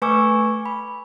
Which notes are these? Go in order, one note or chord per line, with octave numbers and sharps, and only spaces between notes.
A3 B4 G#5 C#6 D6 E6
B5